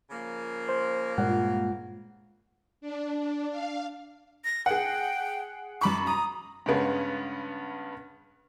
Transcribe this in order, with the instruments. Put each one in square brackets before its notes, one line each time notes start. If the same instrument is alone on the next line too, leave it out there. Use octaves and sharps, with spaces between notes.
[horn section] C#3 F3 A#3
[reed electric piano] C5
[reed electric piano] G2 F#5 [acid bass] A#2 [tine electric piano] G#3 F4
[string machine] D4
D4
F5
[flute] A#6
[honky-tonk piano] G#4 F#5 [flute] G5
[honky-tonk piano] F#2 B5 C#6 [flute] D6
[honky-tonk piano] A#5 [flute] D#6
[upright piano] G2 C#3 G#3 B3 C#4